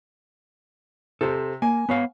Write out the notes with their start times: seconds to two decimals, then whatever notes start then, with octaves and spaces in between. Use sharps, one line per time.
1.21 C3 A4 C5
1.62 A#3 G#5
1.89 B3 C#5 F5